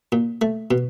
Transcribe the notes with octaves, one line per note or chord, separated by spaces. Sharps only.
A#2
A3
B2